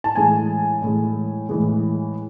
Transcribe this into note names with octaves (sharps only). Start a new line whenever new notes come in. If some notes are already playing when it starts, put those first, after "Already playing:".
A5
A2 E3 G#3 G#5
A2 E3 G#3
A2 E3 G#3